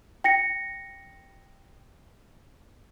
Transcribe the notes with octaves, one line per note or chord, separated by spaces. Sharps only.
G5 A#6 C#7